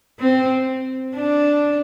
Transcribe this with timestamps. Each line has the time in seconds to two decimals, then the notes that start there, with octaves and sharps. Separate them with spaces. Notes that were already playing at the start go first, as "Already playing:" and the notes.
0.20 C4
1.17 D4